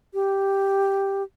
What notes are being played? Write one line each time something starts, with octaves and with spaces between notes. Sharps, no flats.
G4